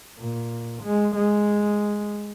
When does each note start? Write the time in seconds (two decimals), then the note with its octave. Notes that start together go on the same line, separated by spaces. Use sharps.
0.19 A#2
0.83 G#3
1.16 G#3